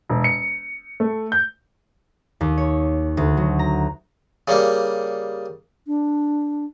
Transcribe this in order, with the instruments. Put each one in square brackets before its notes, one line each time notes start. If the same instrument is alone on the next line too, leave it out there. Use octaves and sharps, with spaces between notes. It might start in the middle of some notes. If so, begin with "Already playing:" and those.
[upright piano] E1
C#7
A3
G6
[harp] D#2
C#5
D2
F#3
A#5
[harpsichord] C#3 G3 A#3
[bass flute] D4